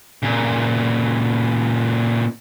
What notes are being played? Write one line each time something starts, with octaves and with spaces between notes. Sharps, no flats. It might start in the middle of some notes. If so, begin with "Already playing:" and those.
A#2 C#3